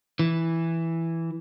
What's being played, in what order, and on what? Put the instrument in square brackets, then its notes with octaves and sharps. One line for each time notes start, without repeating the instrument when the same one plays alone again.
[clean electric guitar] E3